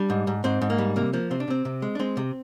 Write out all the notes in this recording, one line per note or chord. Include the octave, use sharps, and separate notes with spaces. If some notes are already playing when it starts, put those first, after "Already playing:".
Already playing: G3 D4
G#2
G#2
G#2 C4
G#2
A#3
G3
C3 A#3
F3 A#3
C3 C4
D4
C3 C4
C3
G#3
D4
G#3 C4
C3